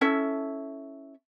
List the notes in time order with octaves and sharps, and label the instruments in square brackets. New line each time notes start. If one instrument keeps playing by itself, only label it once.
[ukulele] C#4 E4 A4 E5